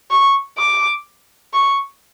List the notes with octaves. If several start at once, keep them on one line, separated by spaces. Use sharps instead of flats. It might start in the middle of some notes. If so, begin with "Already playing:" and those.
C#6
D6
C#6